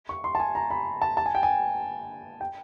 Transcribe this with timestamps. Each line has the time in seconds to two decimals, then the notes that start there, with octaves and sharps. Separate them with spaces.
0.09 C#6
0.24 C6
0.35 A5
0.40 G#5
0.55 A#5
0.70 B5
1.02 A5
1.17 A5
1.26 G#5
1.35 G5
1.43 G#5
2.41 G5